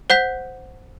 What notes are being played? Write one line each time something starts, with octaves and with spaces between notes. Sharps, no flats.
C5 F#5 G6 B6